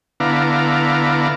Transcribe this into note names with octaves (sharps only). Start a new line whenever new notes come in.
D3 B3 E4 F5 A#5 D6